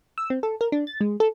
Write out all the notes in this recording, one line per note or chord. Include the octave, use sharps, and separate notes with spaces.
E6
C4
A4
A#4
D4
A6
G#3
A4